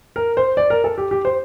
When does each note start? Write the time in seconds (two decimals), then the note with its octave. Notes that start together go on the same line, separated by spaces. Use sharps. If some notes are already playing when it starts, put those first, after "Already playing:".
0.16 A#4
0.37 C5
0.57 D5
0.70 A#4
0.84 A4
0.98 G4
1.11 G4
1.25 C5